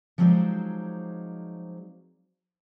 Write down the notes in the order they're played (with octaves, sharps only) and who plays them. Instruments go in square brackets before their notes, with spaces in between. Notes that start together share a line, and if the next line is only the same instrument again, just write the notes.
[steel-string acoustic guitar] F3 F#3 G#3 C4 D#4 D5